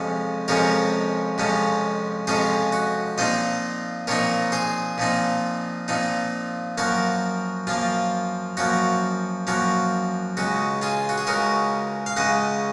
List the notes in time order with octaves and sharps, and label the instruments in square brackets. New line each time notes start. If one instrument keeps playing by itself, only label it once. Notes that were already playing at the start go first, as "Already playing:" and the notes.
Already playing: [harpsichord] F2 C3 F3 G#3 C#4
F2 C3 F3 G#3 C#4 A#4 C#5
F2 C3 F3 G#3 C#4
F2 C3 F3 G#3 C#4 G#4 C5
F#4
A#2 F3 C4 D#4 C5 D#5
A#2 F3 C4 D#4 A#4 C#5
G#4 C5
A#2 F3 C4 D#4
A#2 F3 C4 D#4
F#2 F3 A#3 F#4 A#4
F#2 F3 A#3 F4
F#2 F3 A#3 F#4
F#2 F3 A#3 F#4
C#2 C#3 G#3 F#4
F4 G#4
F#4
G#4
C#2 C#3 G#3 F#4 A#4
F5
C#2 C#3 G#3 D#5 F#5